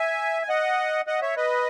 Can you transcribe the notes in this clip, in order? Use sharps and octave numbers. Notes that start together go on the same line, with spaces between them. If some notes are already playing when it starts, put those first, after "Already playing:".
Already playing: E5 G#5
G#5
D#5 F#5
D#5 F#5
C#5 E5
B4 D#5